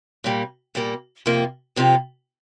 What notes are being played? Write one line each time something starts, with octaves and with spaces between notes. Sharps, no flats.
A#2 G3 A#3
A#2 G3 A#3
F2 C3 A#3 F4
F2 C3 A#3 F4